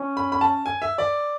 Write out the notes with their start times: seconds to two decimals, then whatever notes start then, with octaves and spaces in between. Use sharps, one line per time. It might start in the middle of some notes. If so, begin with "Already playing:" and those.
Already playing: C#4
0.17 B5
0.32 B5
0.41 A5
0.66 G#5
0.82 E5
0.98 D5